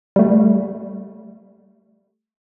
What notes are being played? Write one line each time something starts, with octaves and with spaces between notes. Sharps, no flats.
G3 A3